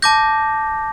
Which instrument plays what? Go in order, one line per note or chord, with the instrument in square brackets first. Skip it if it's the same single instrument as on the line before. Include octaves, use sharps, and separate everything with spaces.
[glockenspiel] A5 D6 G6 A#6